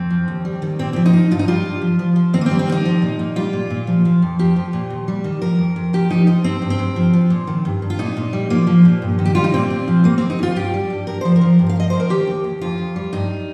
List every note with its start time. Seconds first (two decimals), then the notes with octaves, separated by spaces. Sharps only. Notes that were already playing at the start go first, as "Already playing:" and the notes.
Already playing: F2 C4
0.10 F3
0.28 D#2
0.45 G3
0.62 D#3
0.79 A#2 C4
0.93 F3 C4
1.06 D#4
1.14 F3
1.31 G2 F4
1.39 D#4
1.48 G3 F4
1.65 G2
1.82 F3
1.99 F3
2.16 F3
2.33 D#3 C4
2.41 A#3
2.46 C4
2.51 G3
2.59 C4
2.68 D#3 D#4
2.85 F3
3.02 A#2
3.19 A#2
3.36 G3 F4
3.53 A#2
3.70 A#2
3.87 F3
4.05 F3
4.22 F2
4.39 F3 G4
4.56 F3
4.73 A#2
4.90 D#2
5.08 G3
5.24 D#3
5.42 F3 A#4
5.59 F2
5.76 F2
5.93 F3 G4
6.10 F3 D#4
6.27 F3 D#4
6.44 G2 C4
6.62 G2
6.70 C4
6.79 G2
6.96 F3
7.13 F3
7.30 A#2
7.47 D#3
7.65 G2
7.82 G2
7.90 F4
7.99 A#2 D#4
8.17 A#2
8.33 G3
8.50 F3 A#3
8.67 F3
8.85 A#2
9.02 G2
9.19 D#3
9.25 G4
9.35 G3 F4
9.44 D#4
9.52 A#2 C4
9.70 A#2
9.88 F3
10.04 G3 A#3
10.18 D#2 C4
10.30 D#4
10.39 D#2 F4
10.56 G2 G4
10.74 G3
10.90 G2
11.07 G2 A#4
11.21 F3 C5
11.36 A#4
11.41 F3
11.59 G2
11.69 F5
11.76 F3 D#5
11.90 F3 C5
12.00 A#4
12.10 D#3 G4
12.27 D#2
12.44 D#2
12.61 F2 F4
12.78 F2
12.96 G3
13.13 G2 D#4